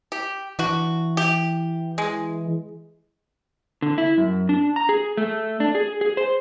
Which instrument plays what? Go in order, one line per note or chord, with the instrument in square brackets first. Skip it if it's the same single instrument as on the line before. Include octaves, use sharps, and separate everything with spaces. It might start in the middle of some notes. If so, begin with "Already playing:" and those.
[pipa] G4
[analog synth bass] E3 [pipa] D4 F#4
[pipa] G4
G#3
[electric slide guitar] D3
E4
F#2
D4
A#5
G#4
A3
D4
G#4
G#4
C5